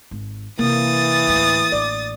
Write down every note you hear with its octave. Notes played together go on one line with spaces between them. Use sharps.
G#1
C3 E3 A#3 D#6 A6
D2 A2
A1 D5